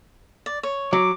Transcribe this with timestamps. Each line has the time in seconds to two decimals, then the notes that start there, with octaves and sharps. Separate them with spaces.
0.46 D5
0.63 C#5
0.93 F#3 D6